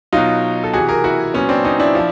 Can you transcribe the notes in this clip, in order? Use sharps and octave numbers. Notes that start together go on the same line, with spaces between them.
B2 F#3 D#4 F4
A4
C3 E3 F#4 G#4
G#4 A#4
E4 F#4
A#2 F#3 B3 C#4
C4 D4
C#4 D#4
D4 E4
F3